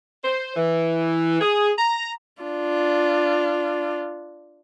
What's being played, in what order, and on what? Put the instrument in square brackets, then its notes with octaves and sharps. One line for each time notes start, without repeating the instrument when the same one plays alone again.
[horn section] C5
E3
G#4
A#5
[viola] D4 F4